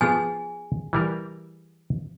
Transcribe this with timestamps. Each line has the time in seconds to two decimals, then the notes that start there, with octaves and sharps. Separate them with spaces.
0.01 F3 B3 F4 G#4 G#5
0.93 E3 G3 A#4